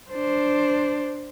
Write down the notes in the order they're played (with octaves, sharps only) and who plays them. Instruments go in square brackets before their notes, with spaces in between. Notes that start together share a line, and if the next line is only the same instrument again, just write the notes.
[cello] D4 C5